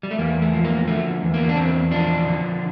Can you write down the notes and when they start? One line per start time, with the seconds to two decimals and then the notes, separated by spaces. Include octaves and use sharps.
0.03 G3
0.11 A3
0.19 E2 A#3
0.42 A3
0.54 F3
0.65 A#3
0.88 D3 A3
1.22 E2
1.34 A#3
1.49 D4
1.57 E2 C4
1.91 F3 D4
2.26 D3